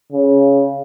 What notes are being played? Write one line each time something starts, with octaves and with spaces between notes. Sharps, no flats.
C#3